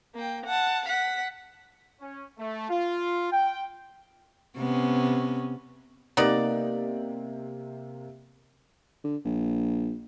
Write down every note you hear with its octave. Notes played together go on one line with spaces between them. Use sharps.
A#3 G5
F#5 A5
F#5 B6
C#4
A3
F4
G5
C3 B3 C#4
C3 A#3 B3 D#4 G4 D5
D3
A#1